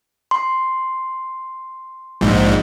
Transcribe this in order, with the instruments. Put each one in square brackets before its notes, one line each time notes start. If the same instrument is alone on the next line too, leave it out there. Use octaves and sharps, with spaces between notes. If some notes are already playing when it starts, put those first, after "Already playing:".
[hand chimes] C6
[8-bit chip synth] A#1 G#2